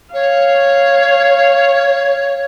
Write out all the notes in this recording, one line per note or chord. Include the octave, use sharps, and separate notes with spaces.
C#5 F5